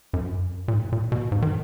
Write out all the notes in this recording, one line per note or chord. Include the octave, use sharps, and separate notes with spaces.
F#2
A#2
G#2
A#2
B2
G#2
D#3